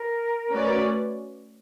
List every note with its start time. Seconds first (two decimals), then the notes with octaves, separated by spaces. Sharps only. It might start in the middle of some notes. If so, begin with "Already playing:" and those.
Already playing: A#4
0.50 A3 C#4 F#4 B4 D5